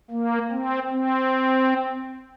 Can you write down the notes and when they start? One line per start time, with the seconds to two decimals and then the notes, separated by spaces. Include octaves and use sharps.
0.11 A#3
0.52 C4
0.90 C4